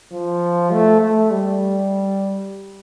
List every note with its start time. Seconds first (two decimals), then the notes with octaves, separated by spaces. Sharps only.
0.12 F3
0.71 A3
1.01 A3
1.31 G3